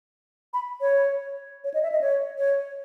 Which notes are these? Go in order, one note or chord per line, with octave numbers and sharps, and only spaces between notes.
B5
C#5
C#5
D#5
E5
D#5
C#5
C#5